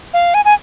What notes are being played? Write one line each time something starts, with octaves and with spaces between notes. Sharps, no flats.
F5
G#5
G#5